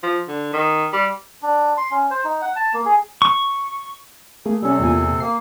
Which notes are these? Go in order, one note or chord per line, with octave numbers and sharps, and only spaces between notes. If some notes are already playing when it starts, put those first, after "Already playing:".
F3
D3
D#3
G3
D4
C6
C#4
C5
D#4
F#5
A5
A#3
G#4
C#6
A3 A#3 G#4
C3 G3 C#4 A4
E2 A#2 G#5
A#3 C7